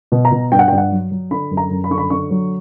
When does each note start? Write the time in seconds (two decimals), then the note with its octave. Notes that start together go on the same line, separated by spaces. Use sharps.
0.12 B2
0.25 A#5
0.32 B2
0.52 G2 G5
0.59 F#5
0.68 G5
0.72 G2
0.78 F#5
0.92 F#3
1.11 F#3
1.31 D3 B5
1.51 F#2
1.57 A#5
1.71 F#2
1.84 B5
1.90 D3 C#6
1.98 B5
2.10 D3 C#6
2.31 F#3